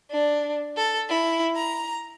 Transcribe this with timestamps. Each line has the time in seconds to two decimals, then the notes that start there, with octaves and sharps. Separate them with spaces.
0.11 D4
0.77 A4
1.09 E4
1.56 A#5